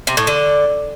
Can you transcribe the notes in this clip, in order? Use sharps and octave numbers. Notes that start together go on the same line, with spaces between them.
C3
A2
D3